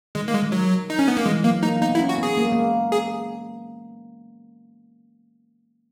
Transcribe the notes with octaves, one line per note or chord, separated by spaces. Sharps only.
D#3 G#3
A#3
G#3
D#3
F#3
D#4
C#4
B3
A#3
E3 G#3
F#3 A#3
A#3 D#4
B3 D#4
E4
C#4
F#4
B3 G#4
A#3
G#3
A#3
G#4